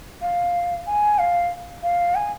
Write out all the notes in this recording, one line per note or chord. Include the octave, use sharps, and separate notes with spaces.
F5
G#5
F5
F5
G#5